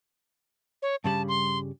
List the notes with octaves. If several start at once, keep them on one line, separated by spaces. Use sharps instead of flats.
C#5
G2 C#3 G3 A5
C6